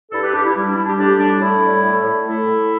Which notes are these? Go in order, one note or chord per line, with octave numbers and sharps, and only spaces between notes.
G2 E4 A4
G4 B4
G2 D4 G4
E4
G3 E4
D4
G3 E4
D4 G4
A2 D4 G4
G3 D4
A2 E4
G3
A2
A2
A3 E4 A4
A2